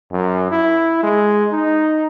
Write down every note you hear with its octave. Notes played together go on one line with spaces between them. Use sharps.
F#2
E4
G#3
D#4